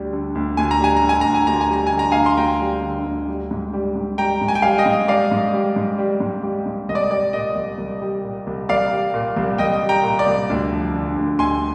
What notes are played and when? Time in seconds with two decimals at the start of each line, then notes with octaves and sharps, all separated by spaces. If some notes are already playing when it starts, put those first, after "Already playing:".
Already playing: D2 G3
0.13 D3
0.35 D2
0.57 D2 G#5
0.71 A#5
0.80 G3 G#5
0.97 A#5
1.03 D3
1.09 G#5
1.21 D2 A#5
1.34 G#5
1.47 D2 A#5
1.61 G#5
1.70 G3 A#5
1.87 G#5
1.93 D3
1.99 A#5
2.12 D2 F5 G#5
2.26 C6
2.37 D2 G5 A#5
2.61 G3
2.82 D3
3.06 D2
3.28 G3
3.51 G#2
3.73 G3
3.95 G#2
4.18 G3 G5 A#5
4.41 G#2
4.48 G#5
4.55 G5
4.62 G3 F5 G#5
4.78 D#5 G5
4.86 G#2
5.08 G3 D5 F5
5.31 G#2
5.53 G3
5.76 G#2
5.99 G3
6.20 G#2
6.43 G3
6.66 G#2
6.89 C2 D#5
6.95 D5
7.11 G3 D5
7.33 A#2 D#5
7.56 C2
7.78 C2
8.02 G3
8.23 A#2
8.47 C2
8.69 C2 D5 F5
8.91 G3
9.14 A#2
9.36 C2
9.58 C2 D#5 G5
9.82 G3
9.89 G5 A#5
10.04 A#2
10.19 D5
10.26 C2
10.50 D2
10.71 F3
10.95 D3
11.17 D2
11.39 D2 G#5 C6